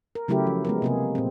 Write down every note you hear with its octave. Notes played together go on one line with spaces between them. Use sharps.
A#4
C#3 F#3 A3 E4 G4 A#4
F3
G#3 B3 A#4
C3 A#3 G#4
A#2 C4